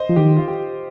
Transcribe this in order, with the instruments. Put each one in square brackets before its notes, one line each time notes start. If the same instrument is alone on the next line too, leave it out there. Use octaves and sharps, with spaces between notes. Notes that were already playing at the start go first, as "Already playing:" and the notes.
Already playing: [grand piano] C5 D#5
[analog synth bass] F3
[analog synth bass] D#3 [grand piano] G4
[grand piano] F4
G4